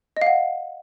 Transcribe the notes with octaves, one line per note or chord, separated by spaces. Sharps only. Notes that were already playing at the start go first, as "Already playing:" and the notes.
D#5 F5 F#5